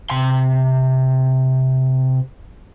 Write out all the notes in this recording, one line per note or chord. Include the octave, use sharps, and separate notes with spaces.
C3 C6